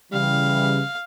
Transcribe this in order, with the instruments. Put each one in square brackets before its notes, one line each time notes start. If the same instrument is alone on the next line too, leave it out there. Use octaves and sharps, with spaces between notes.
[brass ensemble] C#3 E3 G3 [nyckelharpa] F5